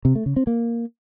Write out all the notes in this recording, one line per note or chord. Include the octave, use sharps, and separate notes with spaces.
C3
A3
C#3
C4
A#3